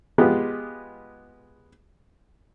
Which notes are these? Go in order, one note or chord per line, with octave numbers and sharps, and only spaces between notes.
G#3 B3 F4 G4